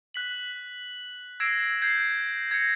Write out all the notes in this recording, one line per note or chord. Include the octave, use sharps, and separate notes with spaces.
F#6 B6 F#7
E6 G#6 A#6 C7 D7 E7
G6 G#6 C7
G#6 A#6 C#7